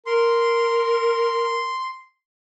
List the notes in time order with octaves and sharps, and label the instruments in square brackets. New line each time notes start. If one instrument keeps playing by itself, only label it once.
[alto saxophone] A#4 [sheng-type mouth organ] C6